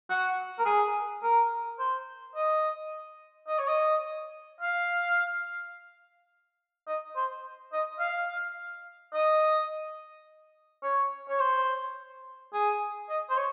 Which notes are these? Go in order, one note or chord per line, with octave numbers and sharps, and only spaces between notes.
F#4
A#4
G#4
A#4
C5
D#5
D#5
C#5
D#5
F5
D#5
C5
D#5
F5
D#5
C#5
C#5
C5
G#4
D#5
C5
C#5